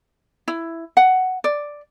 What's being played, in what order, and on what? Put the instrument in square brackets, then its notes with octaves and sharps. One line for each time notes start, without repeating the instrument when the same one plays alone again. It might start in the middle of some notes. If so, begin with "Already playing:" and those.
[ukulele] E4
F#5
D5